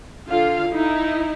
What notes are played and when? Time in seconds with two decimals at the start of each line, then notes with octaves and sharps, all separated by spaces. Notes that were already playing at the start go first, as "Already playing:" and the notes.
0.28 D3 F4 F5
0.70 D#4 E4